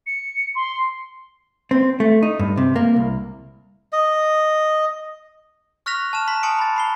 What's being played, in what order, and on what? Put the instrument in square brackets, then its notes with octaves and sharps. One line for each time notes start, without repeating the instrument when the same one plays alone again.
[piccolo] C#7
C6
[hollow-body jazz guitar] C4
A3
D#4
G2
C3
A#3
C2
[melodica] D#5
[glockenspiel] C#6 F6 F#6 A#6 B6 F7
A5 F6 E7
A#5 C6 B6
G#5 A5 C6 D#6 C#7 D7
B5 A6
B5 C7 G7